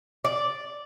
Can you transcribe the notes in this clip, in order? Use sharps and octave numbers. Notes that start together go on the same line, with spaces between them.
D5